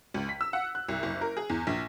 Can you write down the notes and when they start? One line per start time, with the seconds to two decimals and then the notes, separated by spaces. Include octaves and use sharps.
0.14 C#2
0.29 B6
0.41 E6
0.53 F#5
0.75 F#6
0.89 C2
1.03 F#1
1.21 A#4
1.37 G#4
1.50 E2
1.67 A#1